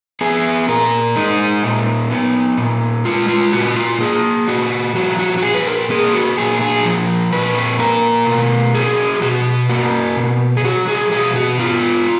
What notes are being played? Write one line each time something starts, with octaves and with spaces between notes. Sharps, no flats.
B3 G#4
A#2 A#4
G#3 D#4
A#2
B3
A#2
G#3 F4
F4
A#2 F#4
F4
A#3 G#4
A#2 F#4
F3 F#4
F#4
F#4
A#2 G#4
B4
A#4
A#3 G#4
F#4
A#2 G#4
G#4
F3
A#2 B4
A#3 A#4
B2
F#3 G#4
B2 F#4
A#3 F#4
B2
G#4
F#3 F#4
G#4
B2 G#4
F#4
B3 F4